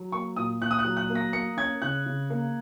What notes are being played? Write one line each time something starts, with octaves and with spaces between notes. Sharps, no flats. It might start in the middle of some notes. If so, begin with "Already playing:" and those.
Already playing: F#3
A#3 C#6
A#2 D#6
A#2 F#6
D#6
F#6
F#3
F#6
A#3
A#6
A#3 C#7
C#4 G#6
C#3 F#6
C#3
A#3